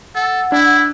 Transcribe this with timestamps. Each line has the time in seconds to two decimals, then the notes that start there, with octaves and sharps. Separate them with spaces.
0.15 A4 F#5
0.52 D4 E4